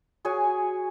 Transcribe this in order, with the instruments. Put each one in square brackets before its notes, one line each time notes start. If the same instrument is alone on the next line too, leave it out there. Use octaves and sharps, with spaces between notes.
[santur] F#4 G#4 C#5 G#5